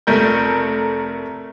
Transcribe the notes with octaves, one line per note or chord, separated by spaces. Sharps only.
F1 A3 A#4 G6